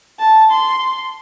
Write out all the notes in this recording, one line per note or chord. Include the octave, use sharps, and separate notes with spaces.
A5
C6